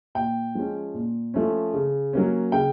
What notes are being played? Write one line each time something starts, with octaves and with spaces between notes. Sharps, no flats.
A#2 G5
F3 G#3 C#4
A#2
F3 A3 C#4
C#3
F#3 A#3 C#4
C#3 G5